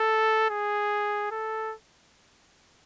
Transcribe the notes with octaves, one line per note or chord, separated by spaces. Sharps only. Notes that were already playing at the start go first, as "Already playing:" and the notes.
Already playing: A4
G#4
A4